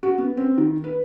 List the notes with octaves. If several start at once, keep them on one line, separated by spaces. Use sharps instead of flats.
F#4
B3
C4
D#3
B4